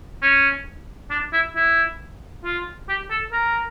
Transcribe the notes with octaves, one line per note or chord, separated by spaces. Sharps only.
C#4
D4
E4
E4
F4
G4
A4
A#4